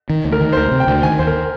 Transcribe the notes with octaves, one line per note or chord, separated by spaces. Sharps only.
D#3
D2
A#4
D#3
C5
D2 A#4
C3
G5
D2
D#3 G#5
D#2 C5
A#4